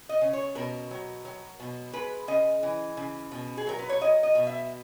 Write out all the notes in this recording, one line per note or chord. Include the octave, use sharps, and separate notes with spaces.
D#5
C#3
C#5
B2 A#4
F#3
F#3
B2
G#3 B4
C#3 D#5
E3
C#3
B2
G#4
F#3 A#4
B4
C#5
F#3 D#5
D#5
B2
E5